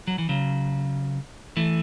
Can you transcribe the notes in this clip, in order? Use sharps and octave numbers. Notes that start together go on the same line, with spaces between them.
F#3
E3
C#3 F#3
E3 A3